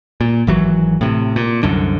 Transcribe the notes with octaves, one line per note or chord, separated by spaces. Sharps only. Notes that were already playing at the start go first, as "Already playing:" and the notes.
A#2
G#1 E3 F#3
A2 C3
A#2
C2 F#2 D3